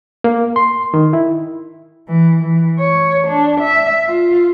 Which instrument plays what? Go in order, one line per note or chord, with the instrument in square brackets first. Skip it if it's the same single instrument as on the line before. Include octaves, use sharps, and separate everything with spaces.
[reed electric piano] A#3
C6
D#3
E4
[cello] E3
E3
C#5
D4
E5
F4